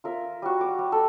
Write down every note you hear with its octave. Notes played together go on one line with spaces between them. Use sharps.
F4 A#4 E5
G3 F#4
D6
G3
A4